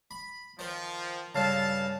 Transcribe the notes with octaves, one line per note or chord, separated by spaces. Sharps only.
B5
D#3 F3 C5
G2 C#3 A4 F5 A5